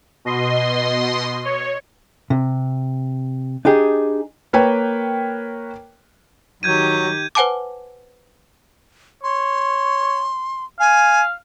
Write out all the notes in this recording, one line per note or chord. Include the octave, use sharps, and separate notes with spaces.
B2 D#5 C6
C#5
C3
D4 D#4 G4 G#4
A#3 B4 C#5 G5
D#3 F#3 G4 G6 G#6 D#7
B4 C5 F#5 G#5 A5 D6
C#5 C6
F5 G#5